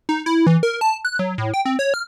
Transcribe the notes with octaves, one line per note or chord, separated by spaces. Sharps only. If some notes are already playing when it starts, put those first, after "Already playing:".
D#4
E4
E3
A#4
A5
F#6
F#3
A2
G5
C4
C#5
F6